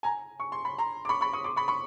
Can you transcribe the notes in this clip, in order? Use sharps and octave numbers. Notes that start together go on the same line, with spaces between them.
G#5 A#5
C#6
C6
B5
A#5 C6
D6
B5 C#6
B5 C#6
C#6 D#6
C6 D6
B5 C#6
B5 C#6